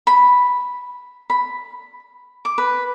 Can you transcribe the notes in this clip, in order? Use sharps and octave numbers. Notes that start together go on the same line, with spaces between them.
B5
B5
D6
B4